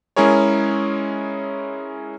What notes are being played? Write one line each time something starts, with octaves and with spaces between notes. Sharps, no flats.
G#3 C#4 E4 G#4 A#4 C#5